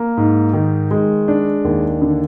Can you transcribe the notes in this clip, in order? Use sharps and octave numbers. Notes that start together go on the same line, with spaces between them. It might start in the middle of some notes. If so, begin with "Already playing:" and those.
Already playing: A#3
G#2
D#3
G#3
D4
D#2
D3